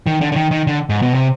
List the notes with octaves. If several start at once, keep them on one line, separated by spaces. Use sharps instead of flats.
D#3
D3
D3
D#3
D#3
D3
G#2
B2
C3